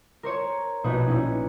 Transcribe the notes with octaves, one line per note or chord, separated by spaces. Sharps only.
A#4 C5 C#5 C#6
A#1 B2 D#4 B4 G#6
C#4 D#4 E4